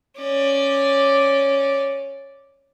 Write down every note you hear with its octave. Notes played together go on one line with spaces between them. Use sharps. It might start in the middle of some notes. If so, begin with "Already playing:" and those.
C#4 D5